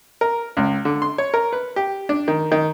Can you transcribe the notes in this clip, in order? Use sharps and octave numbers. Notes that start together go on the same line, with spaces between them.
A#4
C#2
D3
C6
C#5
A#4
B4
G4
D4
D#3
D#3